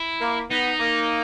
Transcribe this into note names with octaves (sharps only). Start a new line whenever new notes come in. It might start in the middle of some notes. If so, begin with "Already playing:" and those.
Already playing: E4
A#3
B3 D#4
A#3